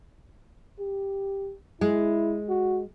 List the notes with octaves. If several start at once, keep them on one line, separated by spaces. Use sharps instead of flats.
G4
G#3 E4
F#4